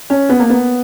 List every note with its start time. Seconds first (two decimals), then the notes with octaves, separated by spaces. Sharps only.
0.10 C#4
0.29 B3
0.39 A#3
0.50 B3